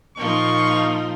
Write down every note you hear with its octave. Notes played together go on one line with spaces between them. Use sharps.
A#2 F3 D#4 F4 C#6